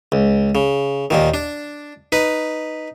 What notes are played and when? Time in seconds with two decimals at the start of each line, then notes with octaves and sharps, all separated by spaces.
0.12 C#2
0.55 C#3
1.10 D#2 A#2 D#3
1.34 D4
2.12 D#4 B4